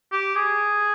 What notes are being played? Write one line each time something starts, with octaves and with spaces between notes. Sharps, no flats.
G4
G#4